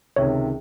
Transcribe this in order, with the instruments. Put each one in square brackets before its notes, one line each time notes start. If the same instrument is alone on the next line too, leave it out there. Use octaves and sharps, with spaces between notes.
[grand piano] C#2 C3 D#3 [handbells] C#5